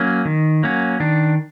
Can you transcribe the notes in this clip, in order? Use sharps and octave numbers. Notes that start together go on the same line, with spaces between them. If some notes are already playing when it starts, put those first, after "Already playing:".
Already playing: F#3 A#3 C#4
D#3
F#3 A#3 C#4
D#3 D4